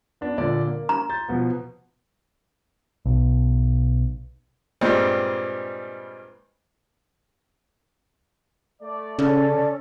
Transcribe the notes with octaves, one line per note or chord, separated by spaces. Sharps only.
B3 D4
A#2 D3 D5
A#3
A#5
C6 G6 A6
B2 F3 B3
B1
G2 A#2 G3 G#3 C4
A3 D5
C#3 C#4 A4 D5